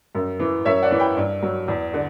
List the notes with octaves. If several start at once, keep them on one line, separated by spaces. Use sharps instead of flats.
F#2
E3
F#2 C#5 E5
D5 F#5
E3
G5 B5
G2
F#3
E2
D3